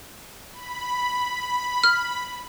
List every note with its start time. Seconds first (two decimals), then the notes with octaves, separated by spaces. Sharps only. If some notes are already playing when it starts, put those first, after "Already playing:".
0.53 B5
1.84 F6